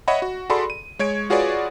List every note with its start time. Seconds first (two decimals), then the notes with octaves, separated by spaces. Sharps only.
0.08 C#5 D#5 E5 F#5 B5
0.22 F#4
0.50 F#4 G#4 A4 D5 B5 C6
0.70 D#7
0.99 G#3 C#5 G#6 D7
1.30 F4 F#4 G#4 B4 C#5 D5